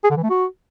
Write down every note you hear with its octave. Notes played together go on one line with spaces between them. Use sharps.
G#4
D3
E3
A3
F#4